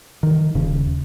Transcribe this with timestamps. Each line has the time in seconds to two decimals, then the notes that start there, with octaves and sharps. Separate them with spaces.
0.23 D#3
0.55 D#1 C#3